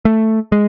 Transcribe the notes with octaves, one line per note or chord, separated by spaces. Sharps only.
A3
G#3